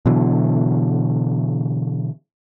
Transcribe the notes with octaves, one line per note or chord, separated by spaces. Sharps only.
B2 D3 E3 F#3